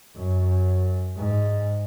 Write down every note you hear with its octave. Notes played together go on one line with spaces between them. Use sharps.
F#2
G#2